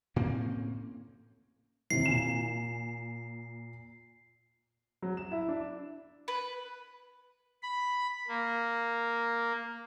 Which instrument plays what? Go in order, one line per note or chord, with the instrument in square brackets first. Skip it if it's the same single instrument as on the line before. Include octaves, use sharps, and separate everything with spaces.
[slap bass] A2 A#3 C4 C#4
[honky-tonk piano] D#2 C3 E3 [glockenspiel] C7
[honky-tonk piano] A#2 G#5 E7
[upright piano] F#3
E7
E4
D4
[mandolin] B4
[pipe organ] B5
A#3